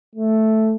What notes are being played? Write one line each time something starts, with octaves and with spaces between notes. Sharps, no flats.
A3